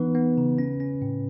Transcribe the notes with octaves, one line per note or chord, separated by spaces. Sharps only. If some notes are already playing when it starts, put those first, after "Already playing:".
Already playing: E3 B3 D#4 B4
B3
C#3
C#4
C#4
A2